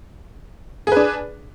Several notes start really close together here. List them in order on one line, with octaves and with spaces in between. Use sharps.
G#4 B4 D4